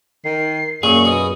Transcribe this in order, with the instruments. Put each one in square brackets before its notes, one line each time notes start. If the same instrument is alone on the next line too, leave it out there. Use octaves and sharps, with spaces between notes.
[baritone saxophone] D#3 [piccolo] C7
[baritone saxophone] F#2 [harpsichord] A#2 [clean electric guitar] G#4 [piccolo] C#6
[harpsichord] B2 [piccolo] D#6